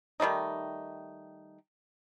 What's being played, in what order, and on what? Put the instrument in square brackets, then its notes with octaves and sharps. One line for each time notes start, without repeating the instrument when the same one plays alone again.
[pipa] D#3 G3 A3 D#4